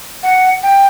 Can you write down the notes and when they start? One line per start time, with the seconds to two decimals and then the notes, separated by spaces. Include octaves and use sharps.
0.23 F#5
0.63 G5